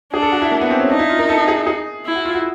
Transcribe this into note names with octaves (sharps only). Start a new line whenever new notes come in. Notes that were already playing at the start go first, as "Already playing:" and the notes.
D4 G#4
A4
F#4
E4
A#3
B3
C4
C#4
D4 D#4
E4
F4
A#4
A4
G#4
G#4
E4
F#4
F4
F#4